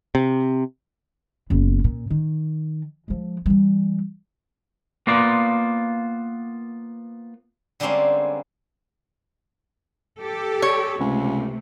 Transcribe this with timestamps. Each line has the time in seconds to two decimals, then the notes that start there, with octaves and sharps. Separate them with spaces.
0.15 C3
1.50 F#1 B3
1.84 A#2
2.10 D#3
3.08 F3 G#3
3.46 E3 G3
5.07 A#3 B3 F4 C5 D5
7.80 D3 G3 G#3 A#3 C4 C#4
10.20 G4 A4
10.62 C#5
11.00 C#2 C3 A3